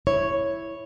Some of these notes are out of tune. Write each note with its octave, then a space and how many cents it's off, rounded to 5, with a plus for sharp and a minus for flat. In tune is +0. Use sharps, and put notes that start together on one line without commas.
E4 +0 C#5 +0